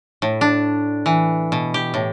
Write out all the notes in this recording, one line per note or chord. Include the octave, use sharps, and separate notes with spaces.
A2
D4
E3
B2
G4
A2